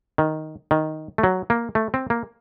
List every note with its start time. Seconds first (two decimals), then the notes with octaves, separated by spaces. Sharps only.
0.18 D#3
0.71 D#3
1.18 A3
1.23 F#3
1.50 A#3
1.75 A3
1.94 C4
2.10 A#3